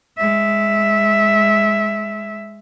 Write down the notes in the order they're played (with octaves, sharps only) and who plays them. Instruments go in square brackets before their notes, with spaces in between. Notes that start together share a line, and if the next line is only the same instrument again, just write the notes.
[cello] G#3 E5